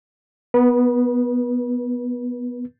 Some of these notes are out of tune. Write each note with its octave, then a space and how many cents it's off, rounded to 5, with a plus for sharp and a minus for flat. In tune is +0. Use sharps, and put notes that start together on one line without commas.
B3 +0 B4 -35